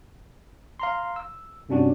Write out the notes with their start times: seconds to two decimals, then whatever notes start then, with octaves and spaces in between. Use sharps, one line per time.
0.80 F5 A#5 C6
1.16 E6
1.69 G2 C3 C#4 D4 F#4 G4